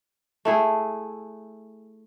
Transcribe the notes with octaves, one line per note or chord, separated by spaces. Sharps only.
A3 E4 G#4